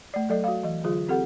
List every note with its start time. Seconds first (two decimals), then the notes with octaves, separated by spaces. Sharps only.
0.14 A3 D5
0.29 F#3 A4 D5 D#5
0.44 F#4 F5
0.64 E3 D#5
0.84 D3 F#3 F4 G#4
1.09 C4 G4 A4 F#5